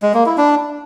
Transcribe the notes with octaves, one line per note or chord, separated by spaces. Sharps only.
G#3
A#3
E4
D4